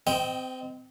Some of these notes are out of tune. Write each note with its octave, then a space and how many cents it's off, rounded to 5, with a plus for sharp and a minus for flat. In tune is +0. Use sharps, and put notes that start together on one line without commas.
C4 -30 D#5 +0 G5 +0